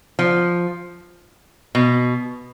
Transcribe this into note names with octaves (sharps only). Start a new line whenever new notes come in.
F3
B2